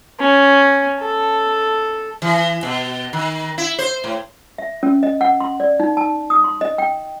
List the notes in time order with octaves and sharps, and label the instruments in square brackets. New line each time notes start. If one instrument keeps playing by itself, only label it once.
[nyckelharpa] C#4
A4
[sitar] E3
B2
D#3
E4
C5
A2
[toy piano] E5
C#4
D#5
F#5
C6
D5
D#4
A5
D#6
C6
D#5
G5